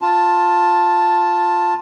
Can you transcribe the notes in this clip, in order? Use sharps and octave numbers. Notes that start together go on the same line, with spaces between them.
F4 A5